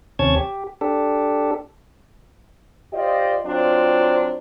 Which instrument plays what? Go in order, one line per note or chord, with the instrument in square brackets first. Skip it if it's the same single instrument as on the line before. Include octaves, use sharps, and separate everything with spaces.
[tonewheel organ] D#2 C3 C#4 C#5 A5 G#6
G4
D4 G4 A4
[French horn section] F4 G4 C5 D5 D#5
F#3 C4 D4 F4